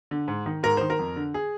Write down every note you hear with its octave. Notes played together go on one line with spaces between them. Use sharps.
D3
G#2
D#3
G#2 A#4
D#3 C5
A#4
F2
D3
G#4